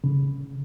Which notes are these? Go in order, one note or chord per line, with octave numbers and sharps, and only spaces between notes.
C#3